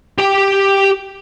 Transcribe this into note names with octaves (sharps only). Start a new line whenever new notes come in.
G4 G5